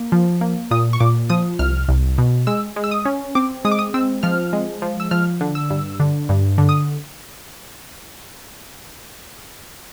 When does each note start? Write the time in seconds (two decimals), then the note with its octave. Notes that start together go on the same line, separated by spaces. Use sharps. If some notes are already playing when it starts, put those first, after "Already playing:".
Already playing: A#3
0.12 F3
0.41 A#3
0.71 A#2 D#6
0.93 C#6
1.00 A#2 D6
1.29 F3 D#6
1.59 C2 F6
1.89 C2
2.18 B2
2.47 G#3 E6
2.76 G#3
2.84 E6
2.91 D#6
3.05 C#4
3.35 C4 D6
3.65 G#3 D#6
3.71 D6
3.79 D#6
3.94 C4 E6
4.23 F3 F6
4.53 G#3
4.82 F3
5.00 E6
5.11 F3 F6
5.41 D3
5.55 E6
5.70 G2
6.00 D3
6.29 G2
6.58 D3
6.69 D#6